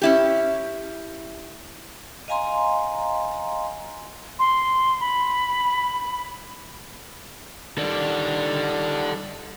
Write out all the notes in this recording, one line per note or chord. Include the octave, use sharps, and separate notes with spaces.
C#4 E4 G4
D#5 F5 G#5 A#5 C6
C6
B5
D#3 G3 A4 D5